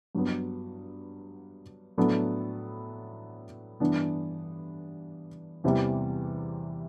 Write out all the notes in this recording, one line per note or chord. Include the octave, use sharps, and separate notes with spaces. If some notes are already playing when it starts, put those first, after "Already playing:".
G2 F#3 B3
A2 F#3 B3 D4 A4
G2 E3 B3 D4
E2 C3 E3 G3